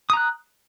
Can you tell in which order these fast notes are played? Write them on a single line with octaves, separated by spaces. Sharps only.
D#6 A#5 F#6